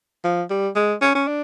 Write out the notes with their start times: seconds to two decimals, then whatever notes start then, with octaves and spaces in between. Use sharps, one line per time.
0.24 F3
0.50 G3
0.76 G#3
1.01 C#4
1.15 C#4
1.27 D4